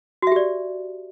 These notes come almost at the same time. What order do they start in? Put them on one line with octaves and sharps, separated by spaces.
F#4 E5 G4 D5